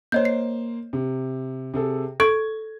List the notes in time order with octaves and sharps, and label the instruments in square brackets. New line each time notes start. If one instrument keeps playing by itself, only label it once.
[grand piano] A#3 C5 [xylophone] C#5 D#5 G6
[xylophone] C7
[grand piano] C3
C3 G#4 A4
[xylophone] A4 C#6 D7 [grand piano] G#6